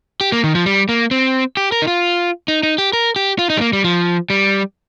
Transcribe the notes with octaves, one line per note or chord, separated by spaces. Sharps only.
G4
A#3
D#3
F3
G3
A#3
C4
G4
A#4
D#4
F4
D#4
D#4
G4
A#4
G4
F4
D#4
G3
A#3
G3
F3
G3